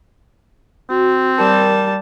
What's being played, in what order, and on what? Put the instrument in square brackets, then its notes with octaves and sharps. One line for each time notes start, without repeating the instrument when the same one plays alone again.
[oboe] C4 [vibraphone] F#4
[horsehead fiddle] G3 A5 [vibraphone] A#4